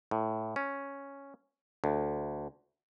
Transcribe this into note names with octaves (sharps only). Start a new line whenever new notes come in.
A2
C#4
D2